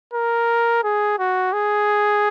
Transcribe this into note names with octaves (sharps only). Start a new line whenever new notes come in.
A#4
G#4
F#4
G#4